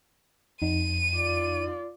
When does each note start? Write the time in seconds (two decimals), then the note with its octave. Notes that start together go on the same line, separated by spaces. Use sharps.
0.62 F2 D#4 D#7
1.16 F4 D5